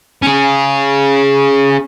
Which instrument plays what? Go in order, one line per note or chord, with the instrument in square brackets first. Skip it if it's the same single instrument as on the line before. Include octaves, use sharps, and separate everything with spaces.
[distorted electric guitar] C#4 G#4